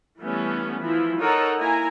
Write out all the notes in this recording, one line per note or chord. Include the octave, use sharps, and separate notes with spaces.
E3 G3 A3 B3 C#4
E3 F3 E4
D#4 A4 A#4 C#5 F#5 A#5
A#3 E4 G#5 A#5